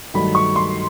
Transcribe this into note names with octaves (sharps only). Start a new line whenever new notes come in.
G2 D#3 F#3 A3 B5
C#6
C6